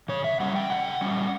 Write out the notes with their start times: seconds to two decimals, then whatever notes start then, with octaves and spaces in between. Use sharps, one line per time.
0.08 C#3 C#5
0.24 E5
0.40 G3 C#4 F#5
0.56 G5
0.70 C#3 F#5
1.01 G3 C#4